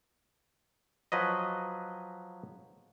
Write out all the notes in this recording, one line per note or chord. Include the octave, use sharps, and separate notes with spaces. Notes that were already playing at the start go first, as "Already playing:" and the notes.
F3 F#3 B4 D#5